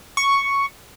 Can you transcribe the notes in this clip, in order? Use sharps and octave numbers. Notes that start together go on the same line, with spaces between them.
C#6